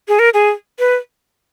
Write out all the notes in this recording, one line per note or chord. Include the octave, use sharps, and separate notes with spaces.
G#4
A#4
G#4
B4